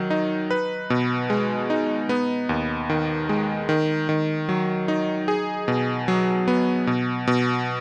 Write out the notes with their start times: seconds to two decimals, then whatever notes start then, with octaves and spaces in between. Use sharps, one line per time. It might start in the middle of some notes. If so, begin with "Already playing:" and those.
Already playing: D#3 F#3
0.10 D#4
0.50 B4
0.90 B2
1.30 G#3
1.70 D#4
2.09 B3
2.49 D#2
2.90 D#3
3.29 G#3
3.69 D#3
4.09 D#3
4.49 F#3
4.88 D#4
5.28 G#4
5.68 B2
6.08 F#3
6.48 B3
6.87 B2
7.27 B2